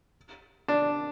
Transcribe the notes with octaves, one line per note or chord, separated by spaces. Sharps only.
D4